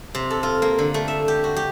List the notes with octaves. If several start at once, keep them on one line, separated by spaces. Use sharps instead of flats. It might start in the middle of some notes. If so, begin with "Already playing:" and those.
C3
A4
F4
A#3
D3
A3
E5
G4
F#4
G4